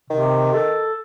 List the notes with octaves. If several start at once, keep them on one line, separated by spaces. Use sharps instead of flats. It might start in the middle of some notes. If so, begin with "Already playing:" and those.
C3 D#3
A4